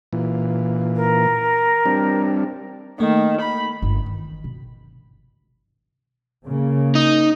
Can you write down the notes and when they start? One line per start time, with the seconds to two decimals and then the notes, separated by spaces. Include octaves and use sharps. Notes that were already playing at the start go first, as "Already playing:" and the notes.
0.13 A#2 E3
0.95 A#4
1.86 G3 C4 D4
3.00 D#3 A3 A#3
3.41 B5
3.82 G1 C#3
4.06 D#3 E3
4.44 B2
6.45 C#3 A#3
6.95 D#4